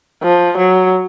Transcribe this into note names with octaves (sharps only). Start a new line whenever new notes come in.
F3
F#3